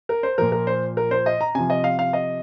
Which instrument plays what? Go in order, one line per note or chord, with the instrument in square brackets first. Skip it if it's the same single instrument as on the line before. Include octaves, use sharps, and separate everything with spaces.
[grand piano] A#4
C5
A#2 F3 A#4
A#4
C5
A#4
C5
D#5
A#5
C3 F3 G#5
D#5
F5
F5
D#5